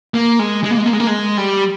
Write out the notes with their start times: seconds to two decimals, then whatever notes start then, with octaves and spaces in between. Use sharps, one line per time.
0.14 A#3
0.39 G#3
0.63 G#3
0.71 A#3
0.78 G#3
0.85 A#3
0.93 G#3
1.00 A#3
1.07 G#3
1.37 G3